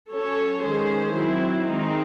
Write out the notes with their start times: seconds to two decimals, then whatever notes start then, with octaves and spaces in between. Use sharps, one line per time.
0.12 F#3 C#4 A4 C#5
0.63 D#3 G#3 C#4 G#4 C5
1.15 F#3 C4 E4
1.67 D#3 G#3 C4 D#4